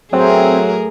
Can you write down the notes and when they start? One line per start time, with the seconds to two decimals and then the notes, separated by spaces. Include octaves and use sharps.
0.13 A2 F#3 C4 G#4 A#4